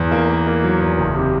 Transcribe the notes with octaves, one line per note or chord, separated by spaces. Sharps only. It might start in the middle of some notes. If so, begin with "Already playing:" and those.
Already playing: E2
A#3
A#3
A#3
F#3
E2
F#1
C3